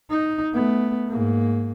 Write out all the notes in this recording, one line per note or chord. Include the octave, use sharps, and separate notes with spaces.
D#4
A3 B3
G#2 A#3